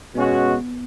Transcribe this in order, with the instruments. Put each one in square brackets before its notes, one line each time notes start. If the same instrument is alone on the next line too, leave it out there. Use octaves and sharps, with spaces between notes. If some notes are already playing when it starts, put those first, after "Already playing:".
[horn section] B2 G#3 C#4 F#4 [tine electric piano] B3